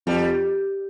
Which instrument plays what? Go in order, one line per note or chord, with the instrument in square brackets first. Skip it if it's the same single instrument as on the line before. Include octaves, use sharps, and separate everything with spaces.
[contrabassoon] F2 [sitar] G3